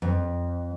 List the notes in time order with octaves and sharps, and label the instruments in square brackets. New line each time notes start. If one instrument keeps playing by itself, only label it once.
[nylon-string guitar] F2